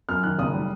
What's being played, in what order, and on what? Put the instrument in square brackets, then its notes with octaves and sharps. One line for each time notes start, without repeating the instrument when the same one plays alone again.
[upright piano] F#2 F6
D#3 F#6
F#1 D#6
G3